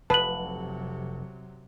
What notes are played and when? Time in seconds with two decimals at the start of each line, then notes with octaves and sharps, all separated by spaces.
0.10 F1 C3 F#3 B4 A5 F#7